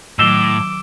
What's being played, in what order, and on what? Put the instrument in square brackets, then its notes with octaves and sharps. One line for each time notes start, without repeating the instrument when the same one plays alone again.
[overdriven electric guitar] A2 [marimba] D#3 F#3 [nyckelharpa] D6 [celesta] E6 E7 G7